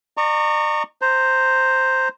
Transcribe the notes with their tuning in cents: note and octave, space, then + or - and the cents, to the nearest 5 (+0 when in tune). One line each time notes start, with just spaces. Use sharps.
D5 +45 A#5 -25 C#6 +0
C5 +0 A#5 -15